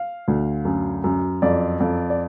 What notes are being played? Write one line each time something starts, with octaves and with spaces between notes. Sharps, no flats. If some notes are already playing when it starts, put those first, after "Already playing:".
Already playing: F5
D2
F#2
F#2
F2 D5
F2
D5